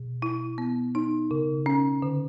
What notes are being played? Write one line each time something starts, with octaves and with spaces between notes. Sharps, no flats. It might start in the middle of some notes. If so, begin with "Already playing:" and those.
Already playing: B2
E4
B3
D#4
C#3
C#4
D3